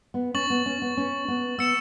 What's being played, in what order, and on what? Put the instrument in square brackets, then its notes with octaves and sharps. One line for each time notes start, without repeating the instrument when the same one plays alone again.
[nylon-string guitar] B3
[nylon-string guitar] C#4 [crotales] C#6 A6 F#7
[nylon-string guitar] B3
C#4
B3
C#4
B3
[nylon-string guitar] B3 [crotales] E6 C#7 E7